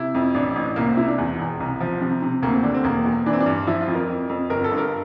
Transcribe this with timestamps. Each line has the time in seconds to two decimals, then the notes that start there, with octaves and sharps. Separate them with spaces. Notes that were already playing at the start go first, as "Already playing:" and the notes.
Already playing: C3 E4
0.15 F2
0.34 A1 D4
0.56 A1
0.76 C2 A#3
0.87 C4
0.97 C3 E4
1.08 D4
1.18 E2
1.39 E1
1.60 C2
1.80 F3
2.01 C3
2.23 C3
2.42 D2 A#3
2.53 C4
2.64 D3 D4
2.74 C4
2.84 E1 A#3
3.05 E2
3.26 E3 D4
3.33 C4
3.40 D4
3.46 G2
3.67 F3 E4
3.81 F4
3.88 F2
3.95 A#4
4.09 F2
4.29 F2
4.50 G1 A#4
4.64 A4
4.71 G2
4.78 A#4